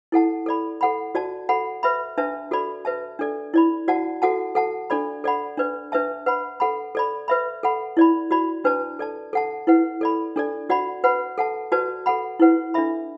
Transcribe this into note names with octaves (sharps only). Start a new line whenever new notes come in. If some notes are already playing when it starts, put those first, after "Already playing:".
E4 A4 F#5 A5
A4 D5 B5
A4 F#5 B5
F#4 D5 A5
A4 F#5 B5
B4 E5 B5
D4 B4 E5 A5
F#4 A4 D5 B5
B4 E5 A5
D4 A4 D5
E4 D5 B5
F#4 D5 F#5 A5
F#4 A4 F#5 A5
A4 F#5 A5
D4 A4 D5 B5
A4 D5 F#5 B5
D4 B4 D5
D4 B4 E5 A5
B4 F#5 B5
A4 F#5 B5
A4 D5 B5
B4 E5 B5
A4 F#5 B5
E4 D5 B5
F#4 D5 B5
D4 B4 D5 A5
A4 D5 A5
A4 F#5 A5
E4 B4 F#5
A4 D5 B5
D4 A4 D5
F#4 D5 F#5 B5
B4 F#5 B5
A4 F#5 A5
F#4 B4 D5 A5
A4 F#5 B5
E4 B4 F#5
D4 A4 E5 B5